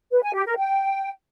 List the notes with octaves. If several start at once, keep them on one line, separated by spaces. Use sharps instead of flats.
B4
G#5
G4
A#4
G5